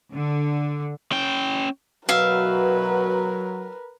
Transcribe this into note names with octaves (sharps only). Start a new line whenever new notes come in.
D3
C#4 G5
B2 F#3 A#4 B4 E5 F5